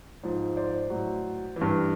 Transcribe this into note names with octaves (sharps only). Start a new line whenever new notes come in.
G#2 F3
C5 D5
A2 F#3
E3
G2